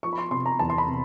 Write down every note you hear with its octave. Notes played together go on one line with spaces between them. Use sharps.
F3 C#6
B5
C6
C3 C6
A#5
E2 A5
C6
B5
C3